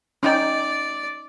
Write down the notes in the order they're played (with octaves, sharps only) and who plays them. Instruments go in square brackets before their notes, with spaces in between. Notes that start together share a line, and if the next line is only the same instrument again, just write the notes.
[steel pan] C#4 D#4 G5 [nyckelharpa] D5